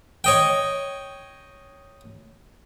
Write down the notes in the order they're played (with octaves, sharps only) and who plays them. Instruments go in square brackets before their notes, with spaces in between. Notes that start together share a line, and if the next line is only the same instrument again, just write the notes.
[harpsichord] C#5 D#5 G5